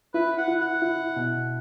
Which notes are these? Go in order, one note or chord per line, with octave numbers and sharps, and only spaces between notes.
E4 B4
F#5
E4
F#5
E4
B2